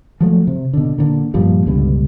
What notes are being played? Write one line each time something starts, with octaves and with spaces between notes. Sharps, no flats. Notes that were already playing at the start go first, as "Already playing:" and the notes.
F3 F#3 A3
C3
B2 D3
A#2 D3
G2 A#2 F3 G3
C#2 G2 B2 D3